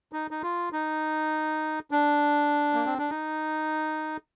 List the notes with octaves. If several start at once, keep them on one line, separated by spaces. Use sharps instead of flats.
D#4
D#4
F4
D#4
D4
A#3
C4
D4
D#4